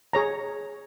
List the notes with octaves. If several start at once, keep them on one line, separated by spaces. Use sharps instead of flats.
G#4 C#5 A#5